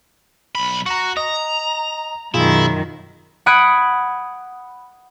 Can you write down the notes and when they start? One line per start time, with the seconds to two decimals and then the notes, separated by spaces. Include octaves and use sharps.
0.55 B1 B5
0.86 F#4 A#5 C#6
1.17 D#5 A#5
2.34 F#2 B2 D#3 E4 F4 G#4
3.46 F#5 B5 D#6 F#6 G#6 D7